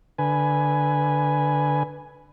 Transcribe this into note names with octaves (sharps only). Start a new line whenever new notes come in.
D3 B4 G#5